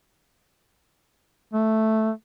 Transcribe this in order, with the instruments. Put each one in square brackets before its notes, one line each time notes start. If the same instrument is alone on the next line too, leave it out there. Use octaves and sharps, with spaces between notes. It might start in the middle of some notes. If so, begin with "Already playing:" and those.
[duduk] A3